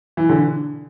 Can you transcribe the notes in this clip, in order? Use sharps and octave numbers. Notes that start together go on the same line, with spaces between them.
E3
D3